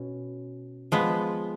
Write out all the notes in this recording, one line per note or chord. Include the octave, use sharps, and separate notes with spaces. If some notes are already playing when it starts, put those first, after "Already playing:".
Already playing: B2 C#4
F3 G#3 B3